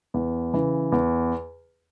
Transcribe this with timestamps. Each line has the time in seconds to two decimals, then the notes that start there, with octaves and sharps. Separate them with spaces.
0.14 E2
0.54 C#3 E3
0.92 E2